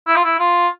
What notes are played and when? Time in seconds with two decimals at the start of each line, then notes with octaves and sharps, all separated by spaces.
0.07 E4
0.16 F4
0.24 E4
0.39 F4